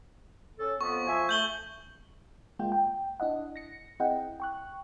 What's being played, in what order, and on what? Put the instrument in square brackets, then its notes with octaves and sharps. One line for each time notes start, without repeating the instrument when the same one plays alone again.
[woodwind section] C#4 A4
[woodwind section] F2 B3 [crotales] C#6
[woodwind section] F3 E5 G#5
[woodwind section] A3 [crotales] G6 F#7 G7
[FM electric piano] G#3 A#3 F4 G5
G5
D4 E4 D#5 F#5
A#6 C#7
C4 E4 G#4 D#5 F#5 G5
G5 C#6 F#6